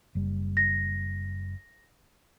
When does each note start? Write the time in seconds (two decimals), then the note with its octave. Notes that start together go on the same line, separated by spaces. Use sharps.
0.15 F#1 G3
0.57 A#6